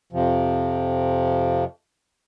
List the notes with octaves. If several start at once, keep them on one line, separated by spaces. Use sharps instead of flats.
F2 C3 F3